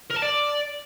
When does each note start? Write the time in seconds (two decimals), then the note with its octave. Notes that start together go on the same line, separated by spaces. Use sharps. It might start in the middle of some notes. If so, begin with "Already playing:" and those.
0.11 A#4
0.17 A5
0.23 D5